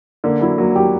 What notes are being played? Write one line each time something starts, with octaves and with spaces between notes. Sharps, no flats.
D3 A#3
F#3 E4
F#3 A#3
F#3 G4